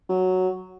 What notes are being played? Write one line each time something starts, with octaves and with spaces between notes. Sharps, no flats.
F#3